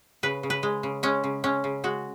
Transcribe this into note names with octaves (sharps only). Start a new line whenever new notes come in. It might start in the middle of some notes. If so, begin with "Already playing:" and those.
C#3 B4
C#3
B4
G#3
C#3
G#3 C#4
C#3
G#3 C#4
C#3
G#3 F#4